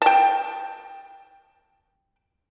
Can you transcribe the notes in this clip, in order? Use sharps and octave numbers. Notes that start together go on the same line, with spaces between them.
G5 A5